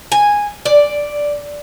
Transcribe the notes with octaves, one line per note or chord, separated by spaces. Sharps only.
G#5
D5